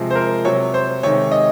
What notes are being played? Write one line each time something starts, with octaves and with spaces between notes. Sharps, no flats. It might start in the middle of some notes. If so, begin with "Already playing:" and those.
Already playing: C3 F3 G#3
C5
A#4
C3 F#3 C#5
C5
C3 D#3 G#3 C#5
D#5